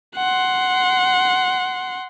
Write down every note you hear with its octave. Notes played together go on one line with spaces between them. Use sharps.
F#5 C6